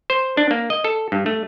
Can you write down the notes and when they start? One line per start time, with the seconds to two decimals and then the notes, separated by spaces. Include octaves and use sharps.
0.10 C5
0.37 D4
0.51 A#3
0.70 D#5
0.84 A4
1.12 G2
1.26 A3